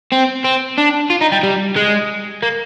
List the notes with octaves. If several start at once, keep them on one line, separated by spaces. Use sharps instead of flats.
C4
C4
D4
F4
D#4
G3
G3
G#3
A#3